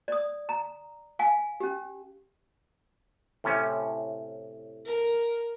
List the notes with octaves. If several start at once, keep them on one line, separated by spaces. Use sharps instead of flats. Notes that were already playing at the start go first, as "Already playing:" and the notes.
D5 D#6
A#5
F5 G#5
C#4 G4
A2 C3 C#4
A#4